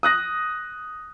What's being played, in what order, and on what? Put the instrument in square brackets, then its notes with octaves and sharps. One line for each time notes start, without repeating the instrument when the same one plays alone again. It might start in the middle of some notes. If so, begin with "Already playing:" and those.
[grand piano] D#6 F#6 A#6